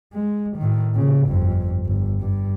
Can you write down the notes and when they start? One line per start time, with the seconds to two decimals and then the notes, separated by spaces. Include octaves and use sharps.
0.13 G#3
0.57 A2 D#3
0.95 A#2 C#3
1.25 G1 F2
1.86 G1
2.20 G2